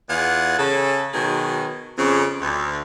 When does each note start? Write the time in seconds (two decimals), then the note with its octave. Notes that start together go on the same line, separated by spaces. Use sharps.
0.09 E2 F4 G#4 F#5
0.58 C#3 A4
1.14 B2 D#3 F#3 G#4
1.98 F2 C#3
2.41 D2